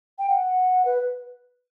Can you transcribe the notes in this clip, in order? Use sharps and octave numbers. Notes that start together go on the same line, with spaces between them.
G5
F#5
B4